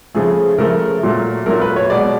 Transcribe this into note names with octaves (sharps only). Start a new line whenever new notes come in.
C#3 F3 A3 G#4
C#3 F3 A3 A#4
A#2 F#3 A3
A#2 F#3 A3 A#4
B4
C#5
B2 G#3 D5